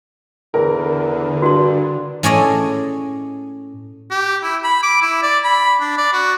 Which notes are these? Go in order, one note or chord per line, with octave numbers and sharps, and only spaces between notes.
E2 D3 A#4
G2 F#4 C6
A2 C#4 G#4 A4 D5 D#5
G4
E4
B5
D6
E4
D5
B5
D4
D5
F#4